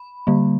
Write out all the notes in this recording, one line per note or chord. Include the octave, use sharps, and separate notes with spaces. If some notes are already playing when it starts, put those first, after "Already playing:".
Already playing: B5
D3 G3 A#3